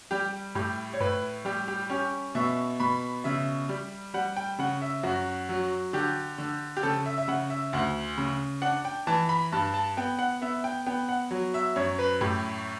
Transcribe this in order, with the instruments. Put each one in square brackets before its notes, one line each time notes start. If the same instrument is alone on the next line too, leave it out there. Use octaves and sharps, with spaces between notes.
[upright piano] G3 G4
A2 G4
C#5
A2 B4
G3 G4
G4
C#4 G4
B2 E5
B2 B5
C#3 E5
G3
G3 F#5
G5
C#3 F#5
E5
F#2 F#4
F#3
D3 G4
D3
G4
C#3 A4
E5
E5
C#3 F#5
E5
D2 F#5
C#3
D4 F#5
G5
E3 A5
B5
G2 A5
A5
B3 G5
F#5
B3 E5
G5
B3 G5
F#5
F#3
E5
F#2 C#5
B4
A2 G4